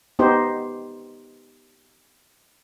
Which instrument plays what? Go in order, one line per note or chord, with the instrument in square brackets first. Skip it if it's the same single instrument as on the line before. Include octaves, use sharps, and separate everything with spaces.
[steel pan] B3 D#4 G4 C5